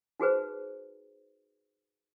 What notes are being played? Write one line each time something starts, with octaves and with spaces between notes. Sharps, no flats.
D#4 F#4 G#4 B4 C5